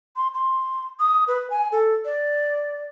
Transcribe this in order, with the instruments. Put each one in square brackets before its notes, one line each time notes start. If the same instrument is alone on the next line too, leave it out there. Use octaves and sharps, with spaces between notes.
[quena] C6
C6
D#6
B4
G#5
A4
D5